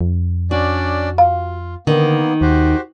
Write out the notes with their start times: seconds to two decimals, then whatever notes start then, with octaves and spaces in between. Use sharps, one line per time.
0.01 F2
0.51 C#4 D4 F#4 D5
1.18 F4 F5
1.87 D3 D#3 A#3 B3
2.41 D#2 F#4 G4 C5